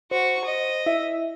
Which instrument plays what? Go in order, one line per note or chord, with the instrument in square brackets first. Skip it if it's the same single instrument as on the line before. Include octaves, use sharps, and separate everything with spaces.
[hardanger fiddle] F#4 C#6 [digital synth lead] C5
[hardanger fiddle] D#5
[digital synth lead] E4 [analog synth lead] E5